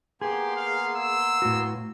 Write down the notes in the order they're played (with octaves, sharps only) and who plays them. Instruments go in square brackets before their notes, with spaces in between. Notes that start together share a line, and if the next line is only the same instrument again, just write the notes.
[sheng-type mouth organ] A#3 B3 C6 [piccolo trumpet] G4 [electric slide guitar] G#4
[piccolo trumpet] F5
E6
[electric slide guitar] A2 F#4